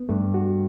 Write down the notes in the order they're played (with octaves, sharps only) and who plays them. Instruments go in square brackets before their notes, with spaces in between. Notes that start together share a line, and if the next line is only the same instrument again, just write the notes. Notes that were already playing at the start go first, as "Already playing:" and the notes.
Already playing: [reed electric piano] B3
[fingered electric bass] G2 [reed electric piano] A3
[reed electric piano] F#4